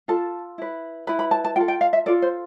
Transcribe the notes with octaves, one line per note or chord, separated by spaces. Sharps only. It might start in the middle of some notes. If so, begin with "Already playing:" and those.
F4 A4 A5
E4 B4
E4 B4 B5
B5
A5
A5
F4 A4 G5
G5
F5
E5
F4 A4 D5
C5